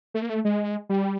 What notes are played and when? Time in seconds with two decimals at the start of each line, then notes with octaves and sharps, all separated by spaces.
0.14 A3
0.22 A#3
0.30 A3
0.45 G#3
0.89 G3